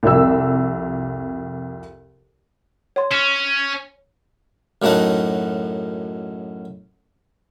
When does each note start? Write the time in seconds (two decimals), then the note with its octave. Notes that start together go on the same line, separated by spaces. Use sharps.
0.03 C2 F2 E6
2.96 C#5 C6
3.11 C#4 E7
4.82 F#2 A2 A3 D#4 F#5